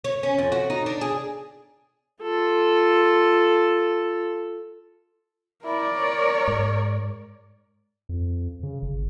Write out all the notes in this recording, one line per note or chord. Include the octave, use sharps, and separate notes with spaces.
C#5
C#4
F2
F#4
D#4
D4
G#4
F4 A4
E4 A#4 D5
C#5
G#2
F2
C#3
G1